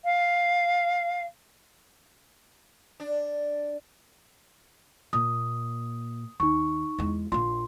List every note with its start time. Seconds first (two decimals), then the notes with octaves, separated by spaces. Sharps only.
0.04 F5
3.00 D4
5.13 A#2 D#6
6.40 D#2 D#4 C#6
6.98 E2 G#3
7.32 A#1 F4 C6